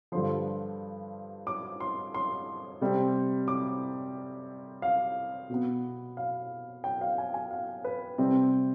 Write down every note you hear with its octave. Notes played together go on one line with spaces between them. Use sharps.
G2 D3 F3 C6
D6
C6
C6
C3 G3 C4
D6
F5
B2 B3
F5
G5
F5
G#5
G#5
F5
B4
C3 G3 C4